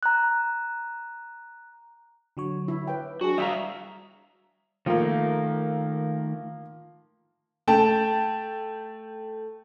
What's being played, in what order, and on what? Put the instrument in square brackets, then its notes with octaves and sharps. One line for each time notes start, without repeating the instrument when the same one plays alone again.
[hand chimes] A#5 F#6
[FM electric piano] D3 F#3 C#5
[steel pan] E4
B4 G5
[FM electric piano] F#3 D4 G#4 [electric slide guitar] F#4
[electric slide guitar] G3 G5 A#5 [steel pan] E5 F5 [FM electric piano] D#6
[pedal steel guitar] D#3 A3 A#4 [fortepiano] F3 A#3
[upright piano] A3 G5 A5